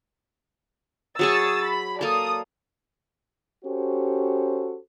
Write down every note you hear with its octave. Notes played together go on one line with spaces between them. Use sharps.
F#3 G#4 C#6 D#6 E6 A6
B5
A#3 A4 D5 D#6
C#4 F#4 G4 A4 C5